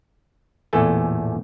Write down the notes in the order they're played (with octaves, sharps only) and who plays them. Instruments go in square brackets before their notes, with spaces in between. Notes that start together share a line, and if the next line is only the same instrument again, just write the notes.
[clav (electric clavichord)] A1 E2 A#2 A3 A4 G#5